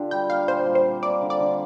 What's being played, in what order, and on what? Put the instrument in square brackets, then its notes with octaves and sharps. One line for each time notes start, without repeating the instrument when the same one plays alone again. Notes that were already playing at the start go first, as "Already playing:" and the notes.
Already playing: [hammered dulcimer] D3 D4 F4 G4
[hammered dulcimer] G3 [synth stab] G5
[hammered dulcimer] A#3 [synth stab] F5
[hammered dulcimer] A#2 [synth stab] C5
[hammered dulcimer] G3
[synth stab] C5
[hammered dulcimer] C4
[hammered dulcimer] A#3 [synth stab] D5
[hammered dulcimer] D3
[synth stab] D5
[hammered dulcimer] D3